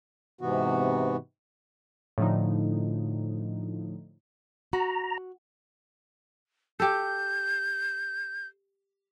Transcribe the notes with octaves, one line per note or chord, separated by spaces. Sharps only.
G#2 C3 E3 B3 F#4
A2 D3 F3 D#4
F#4 A#5
G4 A4 G6